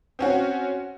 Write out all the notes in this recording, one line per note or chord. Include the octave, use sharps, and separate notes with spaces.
C4 C#4 F#4